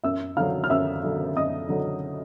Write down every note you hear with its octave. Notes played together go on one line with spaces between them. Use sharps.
F#2 E5 E6
D3 F#3 F5 F6
F6
F#2 E5 E6
D3 F#3
F#2 D#5 D#6
D3 F#3